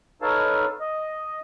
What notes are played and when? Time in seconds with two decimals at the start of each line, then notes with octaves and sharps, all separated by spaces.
0.22 D#4 A4 B4 C#5 F5 A5
0.80 D#5